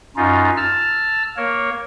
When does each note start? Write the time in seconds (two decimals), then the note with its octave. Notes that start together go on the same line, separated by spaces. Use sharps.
0.16 F#2 C#4 D#4 F4
0.57 A5 E6 F6
1.37 A#3 A#4 C#5